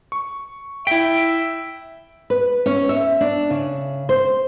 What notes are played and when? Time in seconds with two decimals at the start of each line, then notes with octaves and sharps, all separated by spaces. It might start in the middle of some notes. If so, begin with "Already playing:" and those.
0.12 C#6
0.87 E4 E5 G5 B6
2.30 B4
2.66 C#4
2.89 E5
3.21 D4
3.50 C#3
4.09 C5